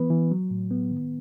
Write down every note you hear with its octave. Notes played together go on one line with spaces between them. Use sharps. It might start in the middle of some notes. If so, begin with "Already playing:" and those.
Already playing: E3 B3 B4
E3
F#3
A2
B3
D#3